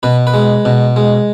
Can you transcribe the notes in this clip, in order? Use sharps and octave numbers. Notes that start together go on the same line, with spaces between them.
B2 B4
B4
G#3
B2
G#3